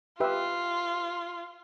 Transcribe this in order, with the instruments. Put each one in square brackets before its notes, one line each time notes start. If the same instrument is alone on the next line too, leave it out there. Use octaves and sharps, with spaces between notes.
[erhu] F4 [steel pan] G4 B4 E5